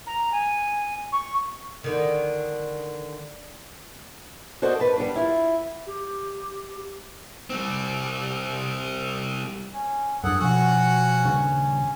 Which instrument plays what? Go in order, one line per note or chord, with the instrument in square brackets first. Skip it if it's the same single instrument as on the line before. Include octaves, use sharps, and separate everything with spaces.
[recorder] A#5
G#5
C#6
[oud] D3 D#3
[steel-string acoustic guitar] F#4 A4 C5 D5 D#5
B4 A5
G3 B3 D4
E4 F4
[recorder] G4
[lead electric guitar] G3 C4
[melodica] C#4
[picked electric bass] F#2 D4 [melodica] G#4 A4 [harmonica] F#5
[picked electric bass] B2 F3 [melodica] C#4 [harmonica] F#4 F#5
[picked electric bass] D#1 G2 C#3